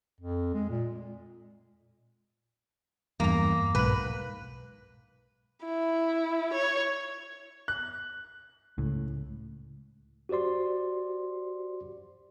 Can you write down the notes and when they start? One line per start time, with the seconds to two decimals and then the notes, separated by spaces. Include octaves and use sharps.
0.21 F2
0.54 G#3
0.69 A#2
3.20 E2 G2 A#3 A#5
3.75 B1 G#2 B4 F#6
5.65 E4
6.53 C#5
7.68 F#6
8.78 C#2 A2
10.29 F#4 G4 C5 D5 C6